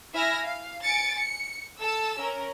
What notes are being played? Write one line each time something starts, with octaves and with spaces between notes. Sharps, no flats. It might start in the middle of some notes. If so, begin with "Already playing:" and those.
E4 E5 G#5 F6 A#6
F5
G#5 A6 C#7 D7
C#7
A4 A5 E6
C#4 A#4